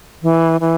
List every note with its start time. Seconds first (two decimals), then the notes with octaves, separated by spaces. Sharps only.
0.23 E3
0.61 E3